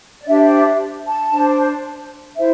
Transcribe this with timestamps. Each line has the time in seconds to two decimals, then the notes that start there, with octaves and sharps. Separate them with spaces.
0.21 D5
0.28 D4 G4 C5 E5
0.54 E5
1.06 A5
1.33 D4 C5
2.37 E4 C5 E5